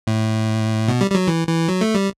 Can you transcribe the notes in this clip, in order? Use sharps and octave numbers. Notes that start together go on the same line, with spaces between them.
A2
B2
G3
G3
F#3
E3
E3
F#3
A3
G3